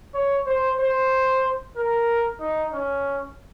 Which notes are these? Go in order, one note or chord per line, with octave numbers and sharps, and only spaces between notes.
C#5
C5
C5
A#4
D#4
C#4